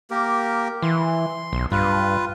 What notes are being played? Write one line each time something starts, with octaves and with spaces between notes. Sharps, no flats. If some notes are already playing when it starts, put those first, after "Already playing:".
A#3 G4 A#4
E3 C6
B1
G2 F4 B4